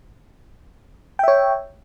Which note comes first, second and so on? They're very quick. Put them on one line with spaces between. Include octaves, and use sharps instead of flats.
G5 E5 C#5